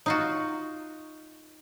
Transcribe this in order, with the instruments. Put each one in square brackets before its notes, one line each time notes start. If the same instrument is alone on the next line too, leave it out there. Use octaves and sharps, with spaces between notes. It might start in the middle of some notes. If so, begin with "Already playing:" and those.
[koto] D#4 F4 F#4